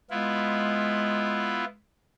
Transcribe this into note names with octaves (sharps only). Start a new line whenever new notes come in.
G#3 B3 E4 F4